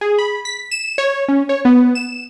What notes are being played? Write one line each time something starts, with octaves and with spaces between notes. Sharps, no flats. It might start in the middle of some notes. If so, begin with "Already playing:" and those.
G#4
B5
B6
E7
C#5
C#4
C#5
B3
E7